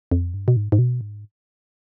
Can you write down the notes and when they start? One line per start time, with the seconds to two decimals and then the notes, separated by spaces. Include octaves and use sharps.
0.12 F2
0.34 G2
0.48 B2
0.56 G#2
0.72 G#2
0.79 B2
1.01 G#2